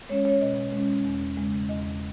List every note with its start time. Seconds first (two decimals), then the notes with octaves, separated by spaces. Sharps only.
0.09 G#3 C#4 C#5
0.25 C#5
0.41 B2 D#5
0.73 G#3 C#4
1.05 E2
1.37 C#3 G#3
1.69 E2 D#5